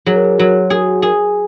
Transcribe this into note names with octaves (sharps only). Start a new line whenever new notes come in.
F#3 G#4
A#4
G#4
F#3 F#4
F#4 G#4
G#4